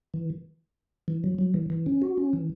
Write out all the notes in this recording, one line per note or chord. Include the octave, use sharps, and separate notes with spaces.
E3
E3
F#3
F#3
E3
E3
C#4
F#4
C#4
E3